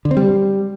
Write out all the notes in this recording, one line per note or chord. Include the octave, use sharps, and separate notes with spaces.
D3
C4
G3